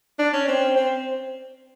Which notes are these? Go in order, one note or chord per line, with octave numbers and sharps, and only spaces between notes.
D4
C#4
C4
C4